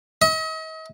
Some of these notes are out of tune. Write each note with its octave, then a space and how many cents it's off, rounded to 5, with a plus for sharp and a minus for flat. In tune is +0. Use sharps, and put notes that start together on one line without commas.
D#5 +40